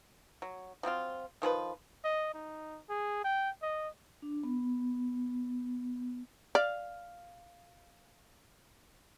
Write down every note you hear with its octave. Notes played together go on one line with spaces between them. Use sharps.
F#3
F3 F#3 C4 F4
D#3 F3 G#4 B4
D#5
D#4
G#4
G5
D#5
D4
B3
D5 F5